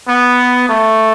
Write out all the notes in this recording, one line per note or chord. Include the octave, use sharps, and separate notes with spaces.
B3
A3